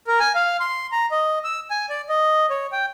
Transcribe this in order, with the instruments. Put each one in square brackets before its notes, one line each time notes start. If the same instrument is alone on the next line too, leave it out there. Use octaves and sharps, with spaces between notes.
[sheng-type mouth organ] A#4
G#5
F5
C6
A#5
D#5
E6
G#5
D5
D#5
C#5
G5